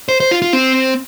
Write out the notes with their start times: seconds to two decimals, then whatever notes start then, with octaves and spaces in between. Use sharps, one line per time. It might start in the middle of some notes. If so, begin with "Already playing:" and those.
0.09 C5
0.20 C5
0.31 F4
0.42 F4
0.53 C4